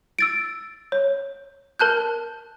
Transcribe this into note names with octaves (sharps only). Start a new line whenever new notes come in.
E6 A6 D7
C#5
A#4 A5 F#6 G6